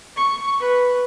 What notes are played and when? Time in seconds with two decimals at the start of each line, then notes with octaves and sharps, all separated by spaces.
0.16 C#6
0.60 B4